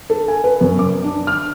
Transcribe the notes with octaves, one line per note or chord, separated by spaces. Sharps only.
A4
G#5
B4
F#2
D6
D4
F6